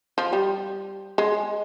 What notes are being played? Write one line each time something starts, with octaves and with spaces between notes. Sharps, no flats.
F3
G3
G#3